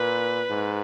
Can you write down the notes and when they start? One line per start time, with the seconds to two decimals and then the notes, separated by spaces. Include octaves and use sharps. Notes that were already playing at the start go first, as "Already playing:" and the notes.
Already playing: A#2 B4
0.50 G#2